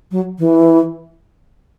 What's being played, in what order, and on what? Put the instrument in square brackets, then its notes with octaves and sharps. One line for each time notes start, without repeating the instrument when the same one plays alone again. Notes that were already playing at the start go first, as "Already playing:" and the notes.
[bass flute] F#3
E3